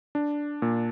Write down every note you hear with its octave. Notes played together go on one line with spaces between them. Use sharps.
D4
A#2